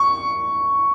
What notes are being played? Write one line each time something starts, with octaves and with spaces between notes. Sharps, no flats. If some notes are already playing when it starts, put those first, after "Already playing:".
Already playing: C#6